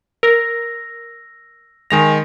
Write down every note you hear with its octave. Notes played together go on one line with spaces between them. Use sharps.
A#4 E6 A#6
D#3 G#3 G#5 A#6 F7